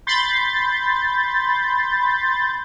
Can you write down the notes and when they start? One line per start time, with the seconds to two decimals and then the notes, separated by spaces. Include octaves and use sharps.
0.07 B5 C6 G6 A6